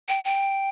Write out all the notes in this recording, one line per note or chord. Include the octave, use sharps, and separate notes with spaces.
G5
G5